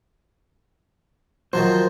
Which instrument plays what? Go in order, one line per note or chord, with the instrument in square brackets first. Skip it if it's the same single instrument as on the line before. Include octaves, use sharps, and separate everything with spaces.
[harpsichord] D#3 F3 F#3 [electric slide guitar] C5